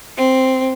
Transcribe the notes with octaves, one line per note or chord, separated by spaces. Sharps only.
C4